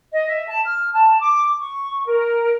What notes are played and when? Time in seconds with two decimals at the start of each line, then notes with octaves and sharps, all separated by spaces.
0.12 D#5
0.28 E5
0.48 A5
0.65 F6
0.93 A5
1.19 D6
1.59 C#6
2.06 A#4